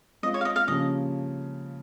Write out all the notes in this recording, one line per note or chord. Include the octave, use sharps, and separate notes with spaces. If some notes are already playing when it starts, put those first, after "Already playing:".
G#3 C4 F4 D#5
C#5
F5
D#5
F5
C#3 F3 A#3 C#4 G4 D#5